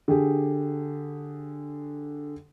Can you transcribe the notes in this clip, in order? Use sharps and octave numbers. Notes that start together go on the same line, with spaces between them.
D3 G4 G#4